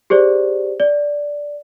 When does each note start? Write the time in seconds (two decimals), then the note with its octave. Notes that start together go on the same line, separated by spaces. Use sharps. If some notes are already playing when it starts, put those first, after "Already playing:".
0.10 G4 G#4 C5 D5
0.80 D5